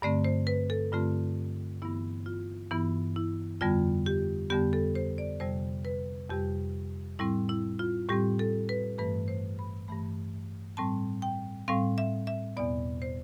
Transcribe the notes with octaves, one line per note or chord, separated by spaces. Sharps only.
G2 D3 A3 C4 D5
C5
B4
A4
G2 D3 A3 C4 F4
G2 E3 B3 E4
F4
G2 E3 B3 E4
E4
F2 D3 G3 B3 F4
G4
F2 D3 G3 B3 G4
A4
C5
D5
F2 C3 G3 C5
B4
F2 C3 G3 G4
A2 G3 C4 E4
E4
F4
A2 G3 C4 G4
A4
B4
G2 E3 A3 B4
C5
B5
G2 E3 A3 B5
A2 G3 C4 A5
G5
A2 G3 C4 F5
E5
E5
E2 B2 B3 D5
C5